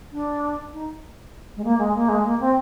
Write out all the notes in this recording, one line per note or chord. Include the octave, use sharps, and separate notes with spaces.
D4
D#4
G#3
A#3
G#3
A#3
G#3
A#3
C4